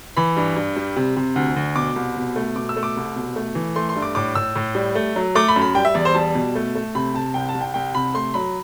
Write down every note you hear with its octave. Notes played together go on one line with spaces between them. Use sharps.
E3 B5
G2
G2
G3
C3
C3
D2
D2
B2 D6
C2
B2
A3
B2 D6
E6
A3
D6
C2
B2
A3
E3
A3 C6
C6
G2
D6
A2 D6
A2 E6
A2
G3
A3
F#3
A3 D6
B5
F#2
B5
G3 G5
E5
E2 D5
C5
G3 A5
B2
A3
A3
C3 B5
C3 A5
C2 G5
A5
C2
G5
C2 G5
C3 B5
A3 C6
F#3 B5